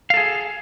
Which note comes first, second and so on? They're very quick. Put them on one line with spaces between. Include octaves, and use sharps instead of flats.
F5 A4 G#4